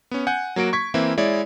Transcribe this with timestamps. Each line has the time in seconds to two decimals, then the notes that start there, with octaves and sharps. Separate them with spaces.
0.11 B3 C#4
0.27 F#5 G#5 G6
0.56 F#3 A#3 F#4 D7
0.73 C#6 G#6 B6
0.94 E3 A#3 C4 E4
1.17 G#3 E4 C#5 D5